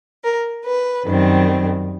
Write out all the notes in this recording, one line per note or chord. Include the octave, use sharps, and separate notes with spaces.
A#4
B4
F#2 D#3 G3 C4